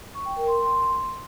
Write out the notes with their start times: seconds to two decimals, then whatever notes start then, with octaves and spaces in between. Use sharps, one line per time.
0.14 C#6
0.25 G5
0.36 A#4
0.47 C6